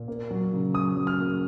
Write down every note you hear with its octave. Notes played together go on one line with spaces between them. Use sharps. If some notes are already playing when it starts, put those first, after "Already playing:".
Already playing: A#2
A#3
F#3
C#3
F#3 D#6
F#3
F6
A#3